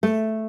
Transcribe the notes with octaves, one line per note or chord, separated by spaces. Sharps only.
A3